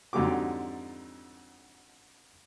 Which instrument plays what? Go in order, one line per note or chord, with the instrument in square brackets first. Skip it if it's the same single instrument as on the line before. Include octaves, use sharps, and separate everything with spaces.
[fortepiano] F2 G#2 D3 F#3 G4 D6